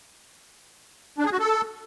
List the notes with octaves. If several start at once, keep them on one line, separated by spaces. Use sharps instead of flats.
D4
G#4
F#4
A4